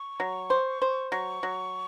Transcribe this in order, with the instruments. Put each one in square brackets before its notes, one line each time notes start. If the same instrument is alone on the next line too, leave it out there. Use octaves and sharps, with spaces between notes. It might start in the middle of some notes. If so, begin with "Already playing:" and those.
Already playing: [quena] C#6
[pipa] F#3
C5
C5
[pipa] F#3 [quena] C#6
[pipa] F#3